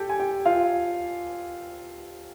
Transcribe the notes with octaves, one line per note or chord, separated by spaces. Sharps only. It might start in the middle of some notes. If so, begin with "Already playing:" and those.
Already playing: G4 A4 G5
G#5
G4 G5
F4 F5